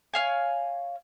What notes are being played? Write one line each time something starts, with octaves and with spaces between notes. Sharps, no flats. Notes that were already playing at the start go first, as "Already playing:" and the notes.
C#5 F5 G#5